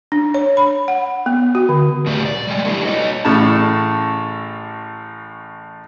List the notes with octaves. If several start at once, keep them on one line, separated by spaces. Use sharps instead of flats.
D4
C#5
B5
F#5
B3
F#4
D3
A#2 C#3 A3 G4 D5
D5
G3 G#3
A3 A#3 D4 E4 G4
F#4 C#5 D#5
A1 A2 C#3 A3 A5